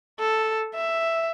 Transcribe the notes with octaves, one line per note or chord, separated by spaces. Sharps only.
A4
E5